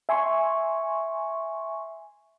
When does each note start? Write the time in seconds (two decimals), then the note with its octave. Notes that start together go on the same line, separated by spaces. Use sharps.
0.09 E5 G#5 C6 C#6